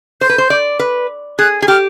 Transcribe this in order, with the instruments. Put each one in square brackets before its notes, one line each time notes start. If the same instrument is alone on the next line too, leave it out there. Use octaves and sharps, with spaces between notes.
[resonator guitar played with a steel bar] C5 [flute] G6
[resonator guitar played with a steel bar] B4
C5
D5
B4
[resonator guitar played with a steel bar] G#4 [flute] F#6
[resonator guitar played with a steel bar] G#4
[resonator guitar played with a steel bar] G4 [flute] F6